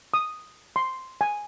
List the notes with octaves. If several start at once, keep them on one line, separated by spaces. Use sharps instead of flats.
D#6
C6
G#5